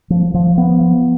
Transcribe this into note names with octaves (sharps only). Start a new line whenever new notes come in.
F3
F3
B3
F3